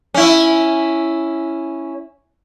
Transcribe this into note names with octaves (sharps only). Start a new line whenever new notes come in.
C#4 E4